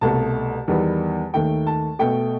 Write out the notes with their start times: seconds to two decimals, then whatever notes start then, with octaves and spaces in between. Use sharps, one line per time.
0.01 C2 B2 A3 A5
0.68 E2 D#3 G3 B3
1.34 D#2 D#3 A3 G5
1.67 A5
1.99 B2 A3 G5